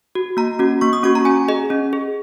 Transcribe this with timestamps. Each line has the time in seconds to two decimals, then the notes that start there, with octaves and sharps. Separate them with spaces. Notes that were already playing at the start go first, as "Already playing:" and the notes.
0.15 F#4
0.37 A#3 A#5
0.59 C#4 F#4
0.81 A#3 C#6
0.93 D#6
1.03 C#4 F#4 C#6
1.15 A#5
1.25 C#4 G#5
1.48 G#4 D#5
1.70 C#4
1.93 G#4